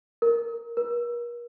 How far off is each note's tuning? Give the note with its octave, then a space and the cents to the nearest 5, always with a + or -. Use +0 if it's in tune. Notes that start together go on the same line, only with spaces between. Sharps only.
A#4 -5
A#4 +40